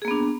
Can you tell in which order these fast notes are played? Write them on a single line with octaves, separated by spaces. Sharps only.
G#4 A#3 B3 D4